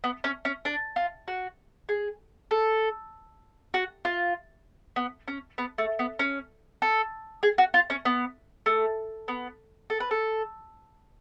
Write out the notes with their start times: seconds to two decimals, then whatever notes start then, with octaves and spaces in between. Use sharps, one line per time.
0.04 B3
0.24 C#4
0.45 C#4
0.65 D4
0.96 F4
1.28 F#4
1.89 G#4
2.51 A4
3.74 F#4
4.05 F4
4.96 B3
5.28 C#4
5.58 B3
5.78 A3
5.99 B3
6.19 C#4
6.82 A4
7.43 G#4
7.58 F#4
7.74 F4
7.90 C#4
8.05 B3
8.66 A3
9.28 B3
9.90 A4
10.00 B4
10.11 A4